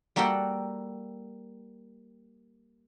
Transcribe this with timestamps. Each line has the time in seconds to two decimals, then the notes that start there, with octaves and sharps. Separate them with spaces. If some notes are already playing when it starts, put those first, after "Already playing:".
0.16 G3 A#3 F#4 A4 G5